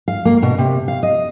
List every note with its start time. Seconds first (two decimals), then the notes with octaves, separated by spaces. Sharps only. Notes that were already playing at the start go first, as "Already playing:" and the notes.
0.08 F5
0.25 A#3
0.42 B2
0.58 C3
0.88 F5
1.03 D#5